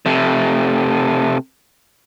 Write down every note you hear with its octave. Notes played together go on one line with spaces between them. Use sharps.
C3 A3